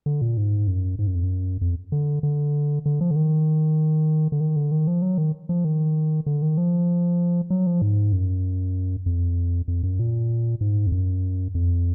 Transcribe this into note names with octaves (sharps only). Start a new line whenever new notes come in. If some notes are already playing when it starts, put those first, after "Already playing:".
D3
A#2
G#2
F#2
G#2
F#2
F2
F#2
F2
D3
D3
D3
F3
D3
D#3
D3
D#3
D3
D#3
F3
F#3
D#3
F3
D#3
D3
D#3
F3
F#3
F3
G#2
F#2
F2
F2
F#2
A#2
G#2
F2
F#2
F2